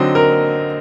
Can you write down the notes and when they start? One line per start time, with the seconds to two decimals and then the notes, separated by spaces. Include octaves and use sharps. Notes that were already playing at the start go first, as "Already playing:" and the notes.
Already playing: D3 F#3 C4 D#4 D#5
0.15 A#4